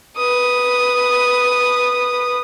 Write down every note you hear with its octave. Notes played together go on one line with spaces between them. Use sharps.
B4 D#6